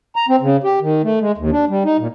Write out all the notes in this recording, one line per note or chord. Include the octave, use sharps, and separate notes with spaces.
A#5
C4
C#3
G4
D#3
A3
G#3
D#2
D4
G3
D#4
A#2